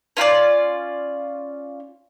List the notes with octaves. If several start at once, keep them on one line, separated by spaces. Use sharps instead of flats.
C#4 F4 B4 D5